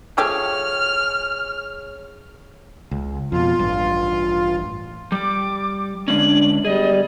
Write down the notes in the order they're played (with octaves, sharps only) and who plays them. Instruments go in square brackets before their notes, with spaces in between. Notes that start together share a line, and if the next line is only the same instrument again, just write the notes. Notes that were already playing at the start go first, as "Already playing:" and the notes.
[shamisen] F3 A3 G4 [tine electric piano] G#4 C#5 [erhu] F6
[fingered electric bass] C#2
[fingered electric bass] F2 B2 [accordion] F4
[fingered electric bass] A1 G2
[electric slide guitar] G3 [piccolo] D6
[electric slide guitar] D3 G#3 C#4 [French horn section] D4 [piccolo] F#7
[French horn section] F#2 B3 D5 [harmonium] G3 [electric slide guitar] G#4 [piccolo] D#5